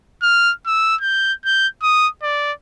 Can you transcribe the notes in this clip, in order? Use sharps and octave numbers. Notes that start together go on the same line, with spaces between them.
F6
E6
G6
G6
D#6
D5